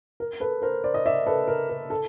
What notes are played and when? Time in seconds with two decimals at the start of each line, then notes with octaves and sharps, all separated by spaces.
0.20 A#4
0.40 A4 B4
0.62 A#4 C5
0.84 C5 D5
0.94 D#5
1.06 D5 E5
1.27 A4 B4
1.48 A#4
1.69 A#4
1.90 A4